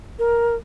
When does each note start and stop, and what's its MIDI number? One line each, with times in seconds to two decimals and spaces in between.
0.19 0.55 70